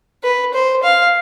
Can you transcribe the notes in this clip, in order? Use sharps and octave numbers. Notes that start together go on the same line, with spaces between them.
B4
C5
F5